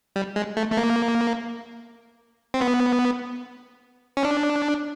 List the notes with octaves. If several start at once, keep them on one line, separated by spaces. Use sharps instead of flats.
G3
G#3
A3
A3
A#3
C4
B3
C#4
D4